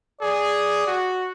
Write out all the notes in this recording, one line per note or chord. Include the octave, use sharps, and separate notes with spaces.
G#4 D5
F#4